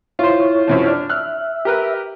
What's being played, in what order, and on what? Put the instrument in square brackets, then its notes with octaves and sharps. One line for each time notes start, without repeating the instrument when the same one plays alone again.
[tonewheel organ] E4 C#5 [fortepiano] F4 C5
[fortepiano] F#2 C3 F3
D4 F6
[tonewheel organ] E5 [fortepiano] F6 F#6
[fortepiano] G4 A#4 B4